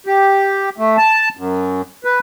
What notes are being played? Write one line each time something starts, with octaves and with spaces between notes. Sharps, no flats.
G4
A3
A5
F#2
B4